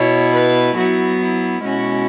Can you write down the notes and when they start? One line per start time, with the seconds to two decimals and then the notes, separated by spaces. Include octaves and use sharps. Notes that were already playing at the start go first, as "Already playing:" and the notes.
Already playing: B2 B3 E4 C#5
0.34 B4
0.77 F#3 B3 E4 F#4
1.21 E4
1.63 B2 G#3 C#4 E4 F#4